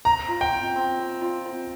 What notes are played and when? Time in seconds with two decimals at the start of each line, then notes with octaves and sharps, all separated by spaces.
0.05 C5 A#5
0.28 F4
0.41 G5
0.52 C4
0.76 C4
0.99 C5
1.21 F4
1.46 C4